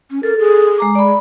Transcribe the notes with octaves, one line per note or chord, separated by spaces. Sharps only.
C#4
A4 A#4
G#4
G#3 A#5 D6
G#3 D5 B5